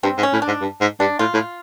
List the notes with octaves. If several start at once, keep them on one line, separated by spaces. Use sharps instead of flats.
G2 C4
G#2
C#4
A2
D4
G#2
G2
G#2
G2 D4
A2 F4
A2